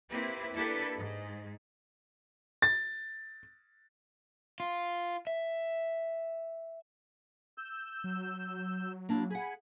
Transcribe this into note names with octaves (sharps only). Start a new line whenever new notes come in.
A#3 C4 E4 G4 B4
A#3 D4 E4 G4 A4 B4
G#2
A6
F4
E5
E6 G6
F#3
A#3 D4 E4
G#4 F#5 G#5 B5